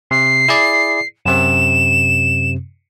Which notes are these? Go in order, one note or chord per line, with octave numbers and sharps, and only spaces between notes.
C3 C7
E4 G#4 D5
F#2 C3 C4 E7